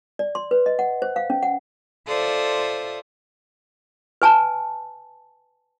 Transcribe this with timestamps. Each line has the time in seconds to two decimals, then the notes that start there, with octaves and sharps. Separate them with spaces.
0.19 D5
0.35 C6
0.51 B4
0.66 D#5
0.79 F#5
1.02 C5
1.16 F5
1.30 C#4
1.43 F#5
2.07 F4 A4 C5 D5 E5 D#6
4.22 B4 G#5 A5